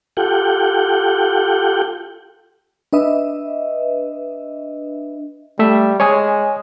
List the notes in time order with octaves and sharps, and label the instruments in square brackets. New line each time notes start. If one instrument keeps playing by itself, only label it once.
[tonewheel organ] F4 G4 A4 F#5 G5
[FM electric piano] D4 B4 D#5 E5
[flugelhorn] G3 [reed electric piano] A3 E5
[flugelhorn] G#3 [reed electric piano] C#5 G#5 D#6